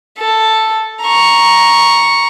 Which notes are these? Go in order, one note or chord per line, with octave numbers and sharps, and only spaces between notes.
A4
A#5 C#6